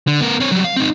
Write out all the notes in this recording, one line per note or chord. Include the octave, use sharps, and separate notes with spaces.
D3
B3 A#4
C4 C#5
F#3 G3
F5
C4 D#4